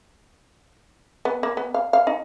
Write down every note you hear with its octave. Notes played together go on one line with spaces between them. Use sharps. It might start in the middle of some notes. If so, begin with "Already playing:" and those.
B3
A#3
B3
F5
F5
D#4